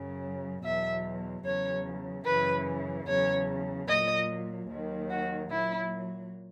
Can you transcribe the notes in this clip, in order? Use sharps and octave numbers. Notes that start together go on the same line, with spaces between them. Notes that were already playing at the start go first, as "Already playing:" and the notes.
Already playing: F#2 C#3 F#3
E2 B2 F#3 E5
E2 C#3 F#3 C#5
F#2 C#3 E3 B4
E2 C#3 F#3 C#5
A#2 F#3 D#5
D#2 D#3 F#3
F#4
A#2 F#3 E4